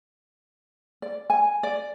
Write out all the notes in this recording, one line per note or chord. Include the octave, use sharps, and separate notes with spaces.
D5
G#5
D5